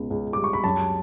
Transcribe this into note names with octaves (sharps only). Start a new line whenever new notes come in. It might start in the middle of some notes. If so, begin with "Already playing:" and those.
Already playing: C#2 B2
C#2
G3 D6
C#6
B5
F#2 A5